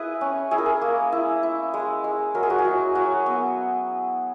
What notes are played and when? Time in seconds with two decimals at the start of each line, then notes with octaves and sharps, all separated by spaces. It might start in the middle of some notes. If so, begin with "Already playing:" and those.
Already playing: E4 G#4 B4 D#5
0.21 C#4
0.51 E4 G#4
0.58 A#4
0.66 G#4
0.81 A#3
1.12 E4
1.43 E4
1.74 G#3
2.04 G#3
2.34 F#3 A#4
2.43 G#4
2.50 F#4
2.58 G#4
2.65 F#3
2.95 F#3 F#4
3.26 B3